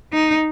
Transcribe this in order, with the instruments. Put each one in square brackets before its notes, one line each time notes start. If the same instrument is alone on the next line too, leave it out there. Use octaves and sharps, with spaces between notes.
[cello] D#4